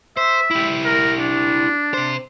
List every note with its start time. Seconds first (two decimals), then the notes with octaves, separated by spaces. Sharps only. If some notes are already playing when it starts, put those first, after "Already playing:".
0.17 C5 E5
0.51 E4 G4
0.85 A#4
1.19 D4
1.94 C3 C5